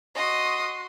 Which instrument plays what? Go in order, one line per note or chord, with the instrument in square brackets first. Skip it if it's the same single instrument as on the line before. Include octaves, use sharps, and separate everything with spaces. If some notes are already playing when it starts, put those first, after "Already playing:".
[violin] F#4 C6 [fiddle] D#5 D#6